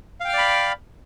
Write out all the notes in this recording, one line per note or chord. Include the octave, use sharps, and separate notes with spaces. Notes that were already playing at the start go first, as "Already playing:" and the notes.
D5 F5 G5 B5 F6